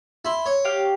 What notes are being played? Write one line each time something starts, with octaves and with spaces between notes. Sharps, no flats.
E4 C6
C#5
G4 F5